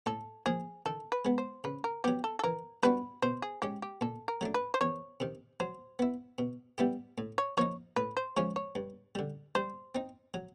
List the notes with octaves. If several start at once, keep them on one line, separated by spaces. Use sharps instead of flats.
A2 A4
F3 A#3 G#4
D#3 A4
B4
G#3 B3
C5
C#3 B4
A#4
F#3 B3 G4
A4
A4
E3 A#4
G3 B3 D4 F#4 B4
B2 C5
G#4
G#3 C#4 G4
G4
A#2 A4
A#4
F#3 A3 D4
B4
C5
E2 C#5
C3 D#3
F#3 C5
B3 E4
B2
G3 B3 E4 G4
A2
C#5
F3 A#3 D#4 C#5
A2 B4
C5
F3 G#3 C#4 F4 C#5
C#5
G2
D3 G3
G3 C5
C4 D#4
F#3